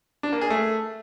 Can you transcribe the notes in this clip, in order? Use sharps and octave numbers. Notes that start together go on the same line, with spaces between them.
D4
A#3
G#4
A3